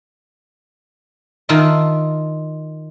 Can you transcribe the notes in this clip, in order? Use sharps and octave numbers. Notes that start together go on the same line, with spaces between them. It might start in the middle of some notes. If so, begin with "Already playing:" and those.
D#3 F4 E5 A5